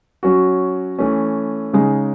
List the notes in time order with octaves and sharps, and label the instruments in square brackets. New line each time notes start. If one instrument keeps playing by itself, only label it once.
[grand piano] F#3 C#4 F#4
E3 A3 C#4
C#3 G#3 D#4